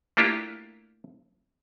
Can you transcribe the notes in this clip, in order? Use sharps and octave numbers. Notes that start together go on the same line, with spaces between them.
A3 A#3 D4 E4 F4 G4